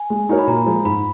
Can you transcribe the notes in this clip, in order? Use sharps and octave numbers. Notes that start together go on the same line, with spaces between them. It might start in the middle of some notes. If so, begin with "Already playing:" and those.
Already playing: G#5
G#3
D#4 F#4 A#4 C#5
B5
A#2 A#5
F3 G#3
G#2 B5